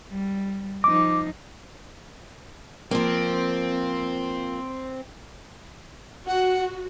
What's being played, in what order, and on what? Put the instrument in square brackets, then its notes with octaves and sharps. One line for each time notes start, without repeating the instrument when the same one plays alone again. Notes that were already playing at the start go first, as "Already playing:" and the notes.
[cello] G3
[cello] F3 D#4 [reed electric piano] D6
[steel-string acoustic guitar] F3 A#3 [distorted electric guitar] C4
[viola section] F#4 [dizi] F#5